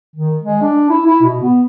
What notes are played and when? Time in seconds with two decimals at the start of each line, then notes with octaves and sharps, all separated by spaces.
0.16 D#3
0.43 G#3
0.62 D4
0.90 E4
1.06 E4
1.22 B2
1.42 B3